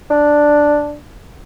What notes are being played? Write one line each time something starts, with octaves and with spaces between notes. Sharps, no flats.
D4